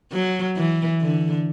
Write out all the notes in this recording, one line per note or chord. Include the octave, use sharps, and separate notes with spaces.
F#3
E3
D3